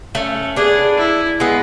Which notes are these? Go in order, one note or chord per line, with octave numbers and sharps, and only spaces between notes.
A3 C#4 A4
B3 D4 G#4
E4
G#3 B3